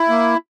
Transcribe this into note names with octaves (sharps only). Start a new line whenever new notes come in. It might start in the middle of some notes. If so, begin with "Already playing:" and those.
Already playing: E4
A#3